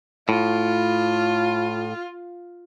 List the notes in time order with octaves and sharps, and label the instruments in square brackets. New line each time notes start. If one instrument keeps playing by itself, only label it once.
[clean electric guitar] A2 [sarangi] F4